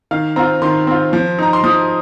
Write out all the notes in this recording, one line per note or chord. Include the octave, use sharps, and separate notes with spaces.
D#3 F5
C4 F4 A#5
D#3 C6
C4 F4
F3
D#4 A#5
C6
F3 D#6